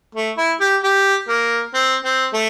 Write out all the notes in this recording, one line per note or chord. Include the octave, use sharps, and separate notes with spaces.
A3
E4
G4
G4
A#3
C4
C4
A3